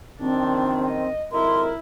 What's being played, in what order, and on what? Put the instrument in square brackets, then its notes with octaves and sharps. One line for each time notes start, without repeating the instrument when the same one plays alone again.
[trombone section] A#1 F#2 D#3 [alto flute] C4 [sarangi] D4
[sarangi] D#5
[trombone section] G#1 F2 A#4 [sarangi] E4 [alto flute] C6